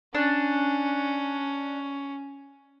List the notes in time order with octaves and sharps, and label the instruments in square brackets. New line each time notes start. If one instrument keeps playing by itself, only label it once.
[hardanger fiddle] C#4 [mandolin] D4